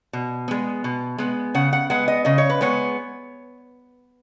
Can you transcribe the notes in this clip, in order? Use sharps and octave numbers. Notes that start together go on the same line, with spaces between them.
B2
G#3 B3
B2
G#3 B3
C#3 F#5
F#5
G#3 B3 F#5
D#5
C#3 D#5
C#5
B4
G#3 B3 C#5